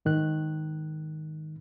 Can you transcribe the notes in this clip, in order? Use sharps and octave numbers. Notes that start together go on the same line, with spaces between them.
G#2 D#3 F#6